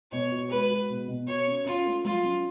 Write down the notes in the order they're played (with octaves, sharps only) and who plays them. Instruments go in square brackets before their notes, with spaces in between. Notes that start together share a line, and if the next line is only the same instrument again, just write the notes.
[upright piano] B2 [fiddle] C#5
[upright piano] F#4
[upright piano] G#3 [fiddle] B4
[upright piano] F#4
B2
B2
[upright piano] F#4 [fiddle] C#5
[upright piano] C#4
[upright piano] C#4 [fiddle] F4
[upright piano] A3
[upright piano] F#3 [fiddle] F4
[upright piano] C#4